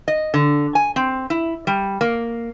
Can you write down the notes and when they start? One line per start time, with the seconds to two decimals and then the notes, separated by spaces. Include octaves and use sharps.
0.08 D#5
0.34 D3
0.75 G#5
0.96 C4
1.30 E4
1.67 G3
2.01 A#3